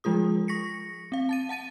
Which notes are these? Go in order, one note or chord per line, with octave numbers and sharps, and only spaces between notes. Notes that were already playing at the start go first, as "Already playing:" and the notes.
F3 G#3 F4 G#4 D#6
C#6 A#6 B6 C#7
C4 F5
A5 A6 D#7
F#5 A5 A6 D#7